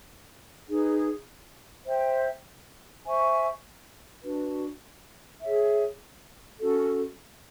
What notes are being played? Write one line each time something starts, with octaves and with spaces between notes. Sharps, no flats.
D#4 G#4 B4
C5 E5 G5
C5 E5 G#5 C#6
D4 F#4 B4
G#4 C#5 E5
C#4 F#4 A4